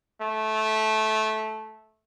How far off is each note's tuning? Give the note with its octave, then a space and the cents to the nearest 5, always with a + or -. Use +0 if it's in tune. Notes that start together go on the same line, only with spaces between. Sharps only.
A3 -15